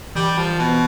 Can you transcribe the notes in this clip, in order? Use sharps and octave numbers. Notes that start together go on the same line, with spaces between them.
E3 G3
F3
B2